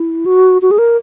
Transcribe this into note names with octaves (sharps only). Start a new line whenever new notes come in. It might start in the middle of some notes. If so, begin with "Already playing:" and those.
Already playing: E4
F#4
F#4
G#4
A#4